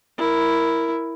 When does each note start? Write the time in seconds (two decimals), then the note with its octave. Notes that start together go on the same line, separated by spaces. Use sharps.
0.17 E4 A#4